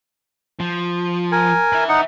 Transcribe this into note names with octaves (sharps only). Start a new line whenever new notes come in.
F3
A#4 G#5
B4 E5
D#4 F#5